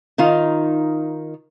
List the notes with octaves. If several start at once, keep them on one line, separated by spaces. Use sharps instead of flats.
D#3 D#4 F4 F5